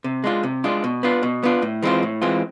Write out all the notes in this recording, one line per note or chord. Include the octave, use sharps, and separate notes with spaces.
C3
G#3 D4 F4
C3
G#3 D4 F4
B2
B3 D4 F4
B2
B3 D4 F4
A2
E3 G#3 C4 F4
A2
E3 G#3 C4 F4